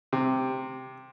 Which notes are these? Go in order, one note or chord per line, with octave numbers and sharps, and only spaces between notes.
C3